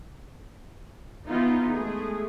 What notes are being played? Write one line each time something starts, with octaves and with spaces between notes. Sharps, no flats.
E3 B3 D#4 F4
G#3 A3 G#4